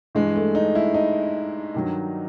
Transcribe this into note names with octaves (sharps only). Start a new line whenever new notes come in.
G2 E3 G#3
A3
D#4
E4
D#4
G2 D#3 F#3